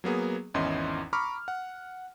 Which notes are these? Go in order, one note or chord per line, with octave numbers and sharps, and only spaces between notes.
F#3 A#3 B3 G#4
G#1 E2 C#4 E4 D#5 C6
A#5 B5 C#6 D6 F6
F#5